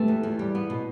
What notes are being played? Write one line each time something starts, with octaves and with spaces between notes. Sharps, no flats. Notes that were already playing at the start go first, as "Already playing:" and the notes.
Already playing: A3 G4 B4
E2
E2
G3
B3
B2